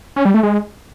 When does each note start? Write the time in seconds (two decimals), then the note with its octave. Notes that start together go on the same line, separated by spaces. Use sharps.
0.16 C#4
0.25 G3
0.34 A3
0.43 G#3